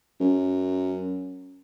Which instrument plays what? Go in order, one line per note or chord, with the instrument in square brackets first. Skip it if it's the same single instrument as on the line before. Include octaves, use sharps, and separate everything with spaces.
[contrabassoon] F#2